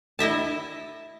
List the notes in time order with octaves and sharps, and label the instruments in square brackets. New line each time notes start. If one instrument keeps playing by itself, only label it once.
[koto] E4 D#5 E5 A5